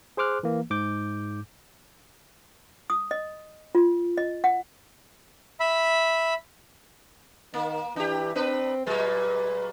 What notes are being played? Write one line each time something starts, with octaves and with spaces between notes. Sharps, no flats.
G#4 C5 C6 D6 F6 F#6
E3 A#3
G#2 D6 G6
D#6
D#5
F4
D#5
F#5
E5 B5
D#3 A#3
E3 D4 G4
C4 D4 B4
A#2 F#3 G#3 B4